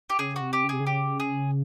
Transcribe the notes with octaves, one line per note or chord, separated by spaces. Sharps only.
G4
C#3 G#4
F#4
C3
G4
C#3
C3 G#4
C#3
G4
G#4